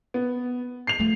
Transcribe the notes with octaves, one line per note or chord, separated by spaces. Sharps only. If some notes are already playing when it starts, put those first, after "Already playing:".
B3
C7 F7
F3 A3